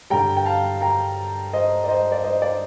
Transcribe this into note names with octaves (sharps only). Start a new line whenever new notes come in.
G2 D3 G3 G5 A#5
G5
F5 A5
G5 A#5
C5 D#5
D5
C5 D#5
D5
C5 D#5
D5